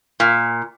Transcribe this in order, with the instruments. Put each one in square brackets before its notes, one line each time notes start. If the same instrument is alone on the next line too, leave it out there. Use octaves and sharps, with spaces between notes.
[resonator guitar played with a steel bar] A#2